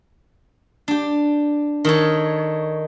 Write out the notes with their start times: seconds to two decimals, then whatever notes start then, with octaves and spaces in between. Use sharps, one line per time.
0.88 D4 G4
1.85 D#3 A4 C#5